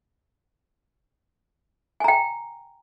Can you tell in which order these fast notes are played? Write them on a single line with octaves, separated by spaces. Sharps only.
G#5 A#5 G5